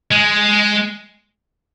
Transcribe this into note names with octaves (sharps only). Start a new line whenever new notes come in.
G#3